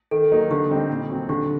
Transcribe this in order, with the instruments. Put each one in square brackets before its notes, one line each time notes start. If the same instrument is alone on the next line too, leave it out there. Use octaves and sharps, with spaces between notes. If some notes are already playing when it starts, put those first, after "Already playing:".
[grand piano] D#3 [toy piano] A4
[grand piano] F#3 A#3 D#4
[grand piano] D3 [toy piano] G4
[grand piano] G3 C4 D#4
A#2
F#3 C4
[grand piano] D3 [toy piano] G4